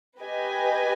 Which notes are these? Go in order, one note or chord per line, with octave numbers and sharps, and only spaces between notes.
G4 B4 D#5 G#5